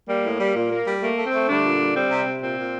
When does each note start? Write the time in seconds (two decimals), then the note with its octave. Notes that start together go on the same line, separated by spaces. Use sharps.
0.09 G3 A#3
0.24 A2
0.40 G3
0.55 A#2
0.71 A#3
0.87 G3
1.02 A3 A#3
1.18 A3
1.26 C4
1.33 A3
1.48 D3 G3 D4
1.64 A#2
1.79 G3
1.95 G3 C4
2.11 C3
2.26 C3
2.42 A#2 C4
2.58 A#2